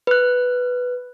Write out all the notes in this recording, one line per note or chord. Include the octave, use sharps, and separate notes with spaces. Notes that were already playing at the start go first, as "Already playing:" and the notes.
B4 F#6